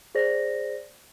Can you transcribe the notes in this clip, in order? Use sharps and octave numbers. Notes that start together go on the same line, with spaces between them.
G#4 C5 D5 A#6